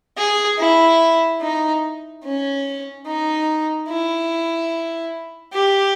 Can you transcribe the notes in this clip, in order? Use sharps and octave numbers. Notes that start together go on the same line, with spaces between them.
G#4
E4
D#4
C#4
D#4
E4
G4